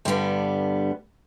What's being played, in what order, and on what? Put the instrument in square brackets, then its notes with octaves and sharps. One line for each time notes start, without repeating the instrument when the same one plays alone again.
[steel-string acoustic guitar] G2 D3 G3 B3